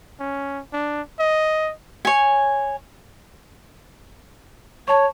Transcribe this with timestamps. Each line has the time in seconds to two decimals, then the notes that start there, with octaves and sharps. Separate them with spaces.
0.19 C#4
0.73 D4
1.19 D#5
2.05 C#5 G#5
4.88 C#5 A5 C#6